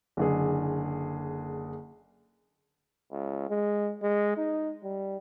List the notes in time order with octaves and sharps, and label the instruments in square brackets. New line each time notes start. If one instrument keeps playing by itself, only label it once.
[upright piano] F#1 D3 G#4
[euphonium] C#2
G#3
G#3
D#4
G3